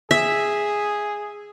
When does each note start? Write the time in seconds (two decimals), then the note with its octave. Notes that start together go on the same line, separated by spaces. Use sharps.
0.11 G#4 E5